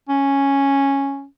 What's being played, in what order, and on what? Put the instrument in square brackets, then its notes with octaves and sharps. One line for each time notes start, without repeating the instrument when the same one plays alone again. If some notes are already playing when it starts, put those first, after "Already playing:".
[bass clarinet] C#4